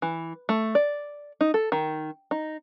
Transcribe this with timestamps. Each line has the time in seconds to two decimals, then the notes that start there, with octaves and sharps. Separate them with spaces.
0.02 E3
0.49 A3
0.75 D5
1.41 D#4
1.54 A4
1.72 D#3
2.31 D#4